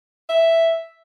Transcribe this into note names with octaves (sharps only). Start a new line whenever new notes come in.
E5